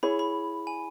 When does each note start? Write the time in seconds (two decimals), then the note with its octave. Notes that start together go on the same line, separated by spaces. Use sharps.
0.03 E4 G#4 C#5 B5
0.19 B5
0.67 G#5